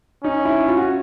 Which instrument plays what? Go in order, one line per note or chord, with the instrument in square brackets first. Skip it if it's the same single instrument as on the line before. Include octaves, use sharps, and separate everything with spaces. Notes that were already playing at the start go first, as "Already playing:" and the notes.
[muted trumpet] C#4 [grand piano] D#4
[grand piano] E4
F4
F#4